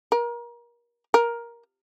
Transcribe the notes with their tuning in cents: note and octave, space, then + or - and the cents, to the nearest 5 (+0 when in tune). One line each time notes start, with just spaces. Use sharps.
A#4 +30
A#4 +10